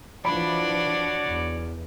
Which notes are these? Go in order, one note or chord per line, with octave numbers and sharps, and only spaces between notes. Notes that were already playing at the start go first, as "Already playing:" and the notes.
E3 F3 D4 F#4 C#5 D5 B5
E2